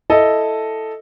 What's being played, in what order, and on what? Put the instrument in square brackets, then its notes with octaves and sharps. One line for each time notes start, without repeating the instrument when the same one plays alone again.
[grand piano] E4 A4 D#5